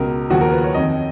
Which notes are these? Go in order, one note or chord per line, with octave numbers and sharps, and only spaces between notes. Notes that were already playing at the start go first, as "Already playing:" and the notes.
Already playing: C#2 B2 A#4
D#2 C#3 F3 F#4
A#4
B4
C#5
F2 D#3 D#5